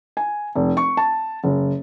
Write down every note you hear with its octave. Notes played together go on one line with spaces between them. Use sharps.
G#5
F1
C#6
A5
F#1